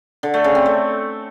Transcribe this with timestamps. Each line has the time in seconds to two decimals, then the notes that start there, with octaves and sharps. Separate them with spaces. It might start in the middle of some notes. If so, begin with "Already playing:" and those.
0.23 D3
0.34 A3
0.44 C#3
0.55 C4
0.66 A3